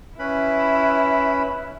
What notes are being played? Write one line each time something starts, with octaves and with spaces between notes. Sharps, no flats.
C#4 E4 B4 B5